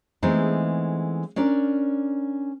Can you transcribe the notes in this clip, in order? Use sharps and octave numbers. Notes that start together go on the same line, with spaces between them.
E3 G#3 A3 B3 C4 D#4
C#4 D4 A#4 D5